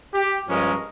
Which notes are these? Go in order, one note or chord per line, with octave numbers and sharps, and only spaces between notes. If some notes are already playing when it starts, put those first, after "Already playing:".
G4
G2 F3 G#3 C#4 A#4